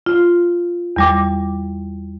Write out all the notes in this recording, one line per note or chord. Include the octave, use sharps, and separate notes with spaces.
F4
E2 G3 D6